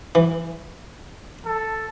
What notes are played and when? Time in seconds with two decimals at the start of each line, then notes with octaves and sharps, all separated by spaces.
0.15 E3
1.45 A4